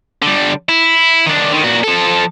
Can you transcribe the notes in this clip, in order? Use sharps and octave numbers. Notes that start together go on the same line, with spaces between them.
D3 G3
E4
D#3 D4
D3 D#3
A#2 F#4
F3 A4